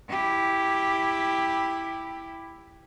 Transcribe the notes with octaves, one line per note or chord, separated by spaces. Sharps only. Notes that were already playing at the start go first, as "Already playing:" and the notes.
E4 G4